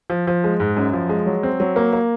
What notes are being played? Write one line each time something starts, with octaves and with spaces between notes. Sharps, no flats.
F3
F3
G#3
G#2
F#2
F3
G#3
F#3
C4
F#3
A#3
A#3